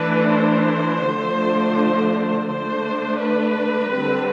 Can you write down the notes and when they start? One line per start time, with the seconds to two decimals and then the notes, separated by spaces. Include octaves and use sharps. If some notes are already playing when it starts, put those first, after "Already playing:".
Already playing: E3 A3 D4 B4
0.35 C5
1.07 D3 F3 A3 D4
2.51 D3 A3 D4 C5
3.23 B4
3.95 D3 G3 C4